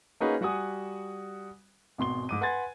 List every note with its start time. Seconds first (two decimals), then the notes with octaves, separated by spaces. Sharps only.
0.20 A#3 C#4 D#4 F#4 G#4 B4
0.41 G3 F#4 F#5 G#5 D#6
1.98 G#1 B2 C6 G7
2.29 G#2 D6 D#7
2.41 B4 F#5 G#5 C6 G#6 A6